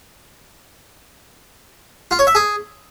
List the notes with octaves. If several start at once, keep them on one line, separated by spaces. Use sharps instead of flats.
F4
C#5
E5
G#4